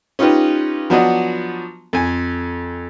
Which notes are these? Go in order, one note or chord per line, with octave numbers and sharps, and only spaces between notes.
C#4 D#4 F4 G4 B4
F3 F#3 B3 D4 F#4 D#5
F2 G#5